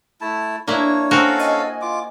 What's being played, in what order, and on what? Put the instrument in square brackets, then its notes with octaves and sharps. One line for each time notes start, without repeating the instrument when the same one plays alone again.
[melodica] A3 E4 A5
[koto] A#3 E4 [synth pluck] D4 [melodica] C#5
[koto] C4 F#4 A#4 [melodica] C#4 A4 F5
[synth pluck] D#5 G#5 G#6
[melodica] F4 D6